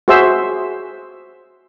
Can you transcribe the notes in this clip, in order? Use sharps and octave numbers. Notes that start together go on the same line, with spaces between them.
F#4 G#4 C5 E5 C6 E6